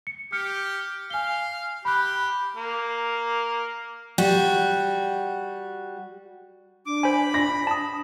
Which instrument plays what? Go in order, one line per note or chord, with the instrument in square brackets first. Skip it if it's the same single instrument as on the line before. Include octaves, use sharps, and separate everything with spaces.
[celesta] C#7
[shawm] G4 [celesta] F6 C#7
[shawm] F5 [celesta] G#5 G7
[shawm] G4 [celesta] B5 F#6
[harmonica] A#3
[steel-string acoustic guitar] G3 F#4
[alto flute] D4 [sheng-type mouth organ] D6
[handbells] C5 G#5 [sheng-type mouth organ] B5
[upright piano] A#6
[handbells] A5 D#6